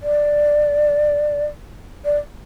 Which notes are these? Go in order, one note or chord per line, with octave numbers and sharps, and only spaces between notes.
D5
D5